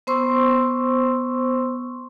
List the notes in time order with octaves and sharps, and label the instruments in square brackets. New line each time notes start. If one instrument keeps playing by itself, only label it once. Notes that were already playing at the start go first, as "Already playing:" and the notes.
[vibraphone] B3 C5 C6 C#6 E6